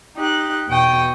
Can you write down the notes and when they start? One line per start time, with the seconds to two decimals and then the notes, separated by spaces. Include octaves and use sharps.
0.15 D#4 G4 F#6
0.68 E2 B2 G5 C#6 D#6